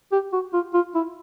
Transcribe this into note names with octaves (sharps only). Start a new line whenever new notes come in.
G4
F#4
F4
F4
E4